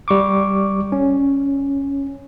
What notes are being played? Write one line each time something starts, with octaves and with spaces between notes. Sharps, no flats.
G3 C#6 D6
C#4